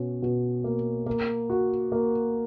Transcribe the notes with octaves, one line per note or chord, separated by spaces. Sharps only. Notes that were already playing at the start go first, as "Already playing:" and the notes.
Already playing: B2 C#4
B2
A#3
A#3
F#4
A#3